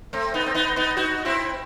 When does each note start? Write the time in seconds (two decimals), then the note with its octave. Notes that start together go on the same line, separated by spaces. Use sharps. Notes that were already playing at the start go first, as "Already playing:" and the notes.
0.13 A3 C4
0.34 B3 D#4
0.46 C4
0.55 B3 D#4
0.76 B3 D#4
0.97 D#4 F#4
1.25 C4 E4